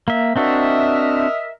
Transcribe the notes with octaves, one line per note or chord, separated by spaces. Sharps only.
A#3 E5
C4 D4 F#4 A#4 D#5 E5